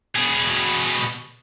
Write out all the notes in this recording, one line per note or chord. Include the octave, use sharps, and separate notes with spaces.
B2 G#4